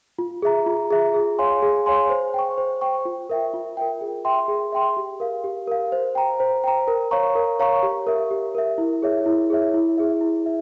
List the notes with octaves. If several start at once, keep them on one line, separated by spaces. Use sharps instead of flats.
F4
G#4 E5 A#5
F4
G#4 E5 A#5
G#4
C#5 F5 G#5 C6
G#4
C#5 F5 G#5 C6
C5
G5 C#6
C5
G5 C#6
F4
A#4 E5 G5
F4
A#4 E5 G5
G#4
E5 G5 C6
G#4
E5 G5 C6
G4
A#4 F5
G4
A#4 F5
C5
G5 A#5
C5
G5 A#5
A#4
C#5 F5 A#5 C#6
A#4
C#5 F5 A#5 C#6
G4
A#4 E5
G4
A#4 E5
E4
G#4 C#5 E5
E4
G#4 C#5 E5
E4
G#4 E5
E4
E5